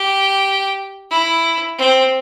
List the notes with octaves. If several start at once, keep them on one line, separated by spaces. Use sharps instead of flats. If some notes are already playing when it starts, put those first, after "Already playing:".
Already playing: G4
E4
C4